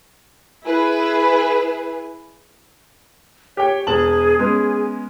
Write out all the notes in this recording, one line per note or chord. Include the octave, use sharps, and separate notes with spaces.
E4 G#4 B4
G4 C#5 G5
E1 G#4 A5 F#7
G#3 B3 C#4 G#4